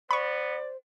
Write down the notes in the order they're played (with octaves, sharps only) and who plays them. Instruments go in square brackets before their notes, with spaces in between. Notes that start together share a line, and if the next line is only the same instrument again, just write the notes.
[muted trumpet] B3 [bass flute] C5 [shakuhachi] D5 [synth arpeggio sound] B5 C#6